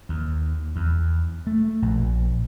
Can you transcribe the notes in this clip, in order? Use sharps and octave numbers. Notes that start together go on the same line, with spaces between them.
D#2
E2
A3
A#1